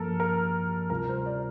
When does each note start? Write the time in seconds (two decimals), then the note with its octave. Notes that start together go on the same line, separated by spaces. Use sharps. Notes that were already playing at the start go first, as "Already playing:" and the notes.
Already playing: G2 F3 A#3 A4 A#4
0.20 A#4
0.90 D2 C3 G3 C4 F4 A#4
1.08 C5
1.26 D5